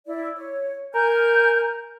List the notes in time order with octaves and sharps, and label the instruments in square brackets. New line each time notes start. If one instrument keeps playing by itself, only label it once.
[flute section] E4 D5
C#5
[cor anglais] A#4 [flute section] G#5 F6 G6